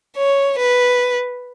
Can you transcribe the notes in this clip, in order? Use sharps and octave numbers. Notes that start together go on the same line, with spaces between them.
C#5
B4